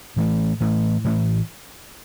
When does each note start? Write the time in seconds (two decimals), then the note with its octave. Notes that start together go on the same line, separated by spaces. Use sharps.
0.17 A2 E3 A3
0.61 A2 E3 A3
1.05 A2 E3 A3